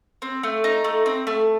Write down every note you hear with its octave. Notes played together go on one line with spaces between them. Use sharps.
C4
A3
D#4
A3
C4
A3